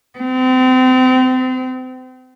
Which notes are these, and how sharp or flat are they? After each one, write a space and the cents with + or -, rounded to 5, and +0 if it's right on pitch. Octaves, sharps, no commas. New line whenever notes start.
C4 -35